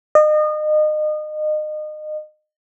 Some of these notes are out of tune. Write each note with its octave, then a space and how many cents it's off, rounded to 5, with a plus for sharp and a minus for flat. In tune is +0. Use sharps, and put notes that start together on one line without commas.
D#5 -30